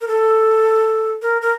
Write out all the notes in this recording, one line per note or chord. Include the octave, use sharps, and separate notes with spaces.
A#4
A4
A#4
A#4